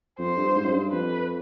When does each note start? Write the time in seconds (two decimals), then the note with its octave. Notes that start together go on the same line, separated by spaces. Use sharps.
0.19 F2 C5
0.37 G2
0.56 G#2
0.65 F#2
0.73 G2
0.91 F2 B4